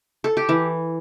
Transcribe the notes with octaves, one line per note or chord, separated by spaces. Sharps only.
A4
G4
E3